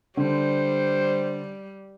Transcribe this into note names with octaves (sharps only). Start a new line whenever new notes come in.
D3 G3 C5